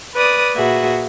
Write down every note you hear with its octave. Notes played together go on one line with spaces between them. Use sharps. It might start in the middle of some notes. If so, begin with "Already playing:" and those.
B4 D5 D#6
A#2 F#4 G#4 B4 E5